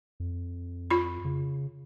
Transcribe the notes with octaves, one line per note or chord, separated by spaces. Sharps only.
F2
F4 B5
C#3